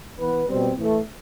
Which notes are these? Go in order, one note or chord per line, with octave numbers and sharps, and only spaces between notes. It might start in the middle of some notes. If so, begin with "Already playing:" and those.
E3 B3 B4
B2 G3 C4
A2 E3 A3